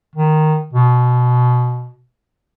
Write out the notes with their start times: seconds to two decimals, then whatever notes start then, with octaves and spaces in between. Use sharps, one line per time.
0.16 D#3
0.73 B2